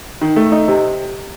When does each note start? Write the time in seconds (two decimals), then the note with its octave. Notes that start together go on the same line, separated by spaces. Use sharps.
0.21 D#3
0.36 A3
0.52 D#4
0.68 C3